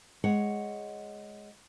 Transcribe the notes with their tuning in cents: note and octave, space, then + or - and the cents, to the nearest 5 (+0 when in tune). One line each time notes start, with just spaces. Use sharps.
G#3 +0 C#5 +0 F#5 +0